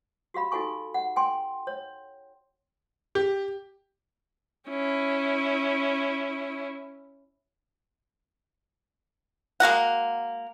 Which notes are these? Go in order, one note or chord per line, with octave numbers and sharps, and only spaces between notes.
F#4 G4 F5 B5
D#4 F#4 A4 G#5 C#6
F#5
G5 G#5 C6
C#5
G4
C#4 E4
G#3 A#3 F#4 F#5